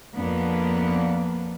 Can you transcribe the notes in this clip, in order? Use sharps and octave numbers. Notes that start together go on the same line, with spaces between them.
F2 A#3 B3 D4